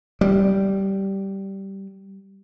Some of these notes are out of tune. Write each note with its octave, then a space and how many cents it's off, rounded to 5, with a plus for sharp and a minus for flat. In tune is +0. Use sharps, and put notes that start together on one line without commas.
G3 -10